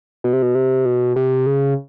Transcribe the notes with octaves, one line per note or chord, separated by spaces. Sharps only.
B2
C3
B2
C3
B2
C3
C#3